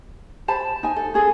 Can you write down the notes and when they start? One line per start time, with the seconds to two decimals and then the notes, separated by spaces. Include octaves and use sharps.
0.48 C5 A5 B5
0.83 D#4 G#5
0.96 A4
1.14 C#4 G#4 A4